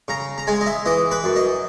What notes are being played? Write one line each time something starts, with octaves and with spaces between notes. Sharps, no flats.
C#3 A#5
A#5
G#3 G#5
D#5
E5
E3 D#5
B4
F#2
D#5